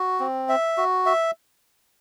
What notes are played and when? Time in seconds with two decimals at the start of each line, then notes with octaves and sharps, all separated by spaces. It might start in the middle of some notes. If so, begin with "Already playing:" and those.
Already playing: F#4
0.20 C4
0.49 E5
0.77 F#4
1.06 E5